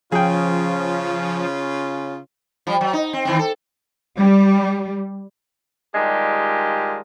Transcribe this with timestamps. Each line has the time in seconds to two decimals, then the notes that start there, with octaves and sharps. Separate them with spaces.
0.12 C#3 F3 C#4 F4 G#4 G5
2.67 F3 G3
2.81 F#3
2.93 D#4
3.13 C4
3.25 D#3 E3 C4
3.39 A4
4.18 G3
5.94 D#3 G3 G#3 D4 F4 G4